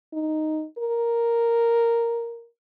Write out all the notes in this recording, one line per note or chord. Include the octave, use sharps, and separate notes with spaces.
D#4
A#4